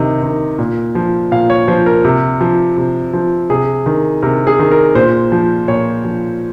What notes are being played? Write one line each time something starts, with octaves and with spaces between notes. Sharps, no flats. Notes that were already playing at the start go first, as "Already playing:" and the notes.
Already playing: C3 D#3 D#5
D#3
A#2
F3
A#2 F5
C#5
F3 C5
A#4
C3
F3
C3
F3
C3 G#4
D#3
C3 A#4
G#4
D#3
A#4
A#2 C5
F3
A#2 C#5
F3